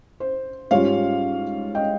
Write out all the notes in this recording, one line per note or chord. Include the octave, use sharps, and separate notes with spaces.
C5
G#2 G3 C#4 F4 C#5 F5
D#5 G5